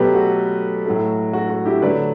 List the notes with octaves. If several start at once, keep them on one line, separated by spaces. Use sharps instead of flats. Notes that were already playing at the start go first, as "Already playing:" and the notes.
Already playing: B2 F#3 A3 G4 B4
F#4 A4
A2 F#3 A3
F#4
F#4
E4 G4
D3 F#3 A3 B4 D5